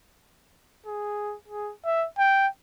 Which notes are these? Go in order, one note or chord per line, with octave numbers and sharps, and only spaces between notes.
G#4
G#4
E5
G5